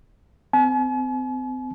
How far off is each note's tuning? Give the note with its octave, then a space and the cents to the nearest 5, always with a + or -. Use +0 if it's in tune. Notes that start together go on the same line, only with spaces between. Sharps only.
C4 -35 G#5 +45